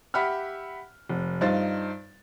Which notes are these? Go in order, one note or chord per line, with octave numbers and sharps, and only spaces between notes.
G4 E5 F#5 B5 F6
F1
G2 D#4 F4 C5 A6